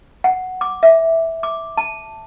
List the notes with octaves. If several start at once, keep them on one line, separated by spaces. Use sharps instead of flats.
F#5
D6
E5
D6
A5